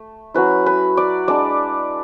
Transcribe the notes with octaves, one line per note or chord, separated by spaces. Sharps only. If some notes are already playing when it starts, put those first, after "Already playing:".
Already playing: A3
F#3 C#4 E4 B4
B4
D5
G#3 D4 D5